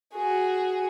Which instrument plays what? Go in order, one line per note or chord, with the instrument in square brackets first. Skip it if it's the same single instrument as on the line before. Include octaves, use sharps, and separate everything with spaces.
[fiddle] F#4 G#4